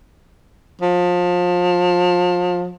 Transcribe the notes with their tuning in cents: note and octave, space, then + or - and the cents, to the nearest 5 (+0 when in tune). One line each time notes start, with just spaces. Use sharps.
F3 +30